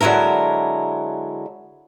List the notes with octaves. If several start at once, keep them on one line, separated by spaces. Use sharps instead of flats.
D3 F#3 G#3 E4 A#4